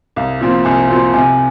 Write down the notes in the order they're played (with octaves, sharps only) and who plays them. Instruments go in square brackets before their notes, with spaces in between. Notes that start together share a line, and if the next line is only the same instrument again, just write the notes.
[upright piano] C2 [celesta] F5
[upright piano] A#2 F3 C4
[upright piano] C2 [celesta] G#5
[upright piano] A#2 F3 C4
[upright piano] C3 [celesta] G#5